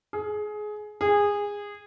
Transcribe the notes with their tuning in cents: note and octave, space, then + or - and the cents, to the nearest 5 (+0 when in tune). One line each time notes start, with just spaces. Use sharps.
G#4 +20
G#4 -20